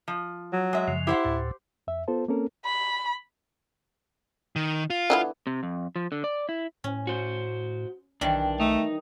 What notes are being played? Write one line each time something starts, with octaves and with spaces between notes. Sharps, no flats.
F3
F#3
G#3 E5
F#2 C#3 F3
E4 G4 C5 F#5
D2 A2
F2 E5
B3 F4 A4 C5 A5
A#3 C4 C#4 A4 A#4
B5
D#3
F4
D3 E3 B3
C3
F2
F3
D3
D5
E4
A2 C#4
F#4 C5
B1 D#3 E3 G3 D4
A3 D#4